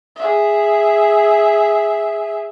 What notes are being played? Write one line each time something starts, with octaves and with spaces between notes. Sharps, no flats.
G#4 E5